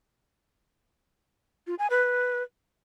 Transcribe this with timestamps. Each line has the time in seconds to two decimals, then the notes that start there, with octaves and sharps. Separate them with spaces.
1.67 F4
1.79 G#5
1.90 B4